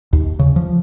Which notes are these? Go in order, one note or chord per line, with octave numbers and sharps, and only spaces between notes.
D#2
C#3
F3